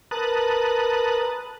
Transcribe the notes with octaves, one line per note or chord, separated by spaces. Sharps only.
A#4 B4 A5 D#6 F#6